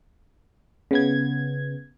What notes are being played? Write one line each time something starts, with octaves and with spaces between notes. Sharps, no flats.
C#3 B3 G#6